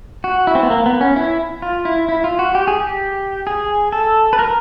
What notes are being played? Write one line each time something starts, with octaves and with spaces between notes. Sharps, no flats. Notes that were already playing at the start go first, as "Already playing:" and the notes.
F#4
E4
C4
B3
A#3
B3
C#4
E4
F4
E4
E4
F4
F#4
G4
G#4
G4
G#4
A4
B4
A#4